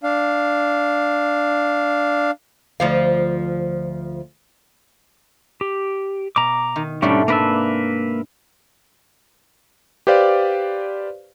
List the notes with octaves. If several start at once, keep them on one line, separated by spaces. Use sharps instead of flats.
D4 F5
D2 F3 F5
G4
B2 A#5 D6
D#3
G#2 B2 G3 A3 C#4 D4
C3 A#3 D4 B4 D5 E5
G4 B4 C5 D5 F5